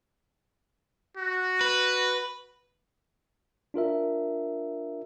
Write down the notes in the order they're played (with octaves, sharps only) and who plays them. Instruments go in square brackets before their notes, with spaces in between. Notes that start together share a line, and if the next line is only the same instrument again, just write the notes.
[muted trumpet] F#4
[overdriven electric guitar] B4
[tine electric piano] D4 F4 A#4 E5